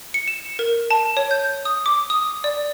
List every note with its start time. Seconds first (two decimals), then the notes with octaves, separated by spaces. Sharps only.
0.14 C#7
0.28 E7
0.59 A#4
0.90 A5
1.17 C#5
1.31 G6
1.65 D#6
1.86 D6
2.10 D#6
2.44 D5